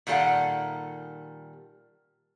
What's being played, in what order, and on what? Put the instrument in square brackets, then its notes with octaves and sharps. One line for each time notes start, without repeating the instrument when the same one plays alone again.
[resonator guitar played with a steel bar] A#2 D#3 G3 A4 F5 F#5